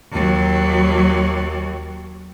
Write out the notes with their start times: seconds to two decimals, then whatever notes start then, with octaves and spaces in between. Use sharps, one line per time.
0.12 D#2 F#3